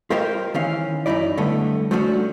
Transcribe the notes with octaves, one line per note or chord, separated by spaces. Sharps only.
F4 G4 A#4 C5 D#5 F5
D#3 E3 C#4 F5
F#2 A#2 D#4 E4 D5
D3 G3 A3 B3
F3 F#3 A3 C#4 D4 F#4